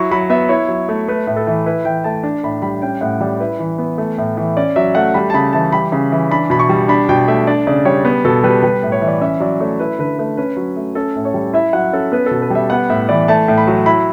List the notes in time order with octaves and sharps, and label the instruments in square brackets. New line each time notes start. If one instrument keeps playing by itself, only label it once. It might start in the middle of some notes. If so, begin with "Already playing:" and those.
Already playing: [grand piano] F#3 E4 C#6
F#3 B5
B3 E5
E4 C#5
F#3
A3
A3 B4
A2
A4
E3
E4 B4
E3 G5
A3 A5
D4
A2 B5
G3 B5
C#4 G5
A2 F#5
G3 D5
E4 B4
E3
B3
A3
A2
E3
C#4 D5
F#3 E5
A3 F#5
G3 B5
A5
C#3 B5
E3 A5
G3 B5
C#3
E3
D4 B5
B2 B5
C#6
G3
D4 B5
B2 G5
A3 E5
D4 D5
C#3 D5
G3 C#5
B3
B2 A4
G3 B4
G3 B4
A2
C#5
E3
D5
C#4 E5
F#3 D5
A3 C#5
E4 B4
D3 B4
A3 B4
C#4 B4
F#3
A3
C#4 A4
A2
C#5
G3
E4 E5
F#3 F#5
C#4 A4
B3 B4
B2 A4
B4
G3 E5
B3 F#5
A2 E5
E3 D5
A3 A5
A2
B5
F#3
E4 B5